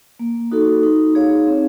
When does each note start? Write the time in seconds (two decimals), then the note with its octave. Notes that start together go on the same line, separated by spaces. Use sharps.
0.19 A#3
0.51 D#4 F#4 A4
0.83 D#4
1.15 G#4 C#5 F5
1.47 C4